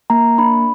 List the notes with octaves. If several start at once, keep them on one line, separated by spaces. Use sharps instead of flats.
A#3 A#5
D4 B5